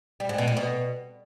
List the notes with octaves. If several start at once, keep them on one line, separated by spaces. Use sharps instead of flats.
G3
G#2
B2
A#2
B2